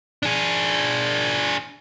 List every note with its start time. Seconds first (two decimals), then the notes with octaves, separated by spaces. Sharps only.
0.23 D4 G#4